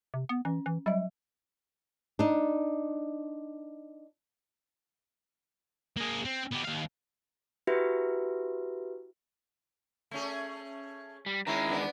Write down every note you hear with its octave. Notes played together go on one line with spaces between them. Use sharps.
C3
B3
E3 C#4
E3
F#3 G3 D#5 E5
D4 D#4
A#3 G#4
C4
B3 G4
D#2 F5
E4 F#4 G4 B4 E5
A3 C#4 G#4
G3
D#3 G#3 C#4 E4 A#5
E2 B3 D4